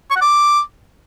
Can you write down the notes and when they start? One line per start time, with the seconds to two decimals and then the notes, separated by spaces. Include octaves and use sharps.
0.11 C#6
0.16 F#5
0.21 D6